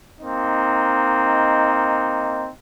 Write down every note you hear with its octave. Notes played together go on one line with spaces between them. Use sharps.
A#3 C4 D#4